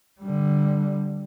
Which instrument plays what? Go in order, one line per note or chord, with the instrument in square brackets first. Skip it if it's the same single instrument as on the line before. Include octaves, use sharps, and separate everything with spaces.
[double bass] D3 G3